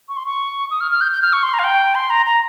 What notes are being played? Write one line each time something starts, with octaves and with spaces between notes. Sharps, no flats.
C#6
C6
C#6
D#6
F6
F6
G6
G6
F6
C#6
C6
A#5
F5
G5
C6
A#5
A#5